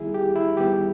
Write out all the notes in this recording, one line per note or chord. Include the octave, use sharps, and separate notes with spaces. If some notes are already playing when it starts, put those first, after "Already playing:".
Already playing: D#2 D#3 G3 B3 E4 G#4
G4
E4
D#2 D#3 G3 B3 G4